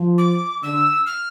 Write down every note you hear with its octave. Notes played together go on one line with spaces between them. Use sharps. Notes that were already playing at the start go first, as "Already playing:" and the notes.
Already playing: F3
D6
D3 E6
F6